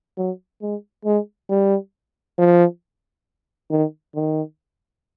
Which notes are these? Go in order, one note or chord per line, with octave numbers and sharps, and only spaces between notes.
F#3
G#3
G#3
G3
F3
D#3
D#3